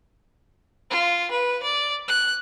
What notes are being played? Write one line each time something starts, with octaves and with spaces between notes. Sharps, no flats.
F4
B4
D5
F#6